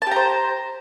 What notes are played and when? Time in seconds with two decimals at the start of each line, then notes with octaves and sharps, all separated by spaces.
0.02 A5
0.07 G4
0.11 A#5
0.16 C5